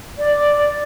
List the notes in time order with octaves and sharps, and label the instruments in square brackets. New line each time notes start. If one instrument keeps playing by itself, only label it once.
[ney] D5